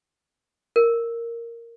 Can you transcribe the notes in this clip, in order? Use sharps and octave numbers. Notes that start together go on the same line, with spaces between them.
A#4